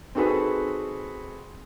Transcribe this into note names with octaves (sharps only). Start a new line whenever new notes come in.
C4 D#4 F#4 G#4 A4 B4